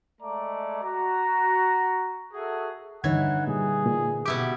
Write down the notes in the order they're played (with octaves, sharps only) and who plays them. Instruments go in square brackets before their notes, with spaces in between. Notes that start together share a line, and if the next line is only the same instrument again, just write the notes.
[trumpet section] G#3 A3 D5 A#5
F#4 A#5
F#4 G#4 A4 E5
[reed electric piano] G2 C#5 G#6 [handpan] D3 D#4 [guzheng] E3 [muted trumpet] F#5
[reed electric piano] A#2 G3 [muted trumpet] G#4
[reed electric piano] A#2
[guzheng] B2 E4 G4 [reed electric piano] D6